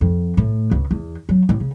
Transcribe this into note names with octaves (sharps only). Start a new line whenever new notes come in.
F2
A2
C#2
E2
F#3
A1
C#3